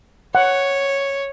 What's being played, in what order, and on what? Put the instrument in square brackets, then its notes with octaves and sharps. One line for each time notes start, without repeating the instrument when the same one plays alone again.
[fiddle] C#5 [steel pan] F#5